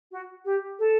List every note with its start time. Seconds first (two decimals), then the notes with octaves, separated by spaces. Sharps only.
0.11 F#4
0.44 G4
0.79 A4